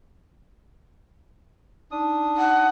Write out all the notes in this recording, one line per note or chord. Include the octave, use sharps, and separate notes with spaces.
D4 D#4 D#6
F#5